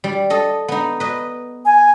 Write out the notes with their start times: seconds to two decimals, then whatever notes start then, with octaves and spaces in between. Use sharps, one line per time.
0.04 G3
0.30 A4 D#5
0.68 B3 D#4
1.00 B4 D#5
1.65 G#5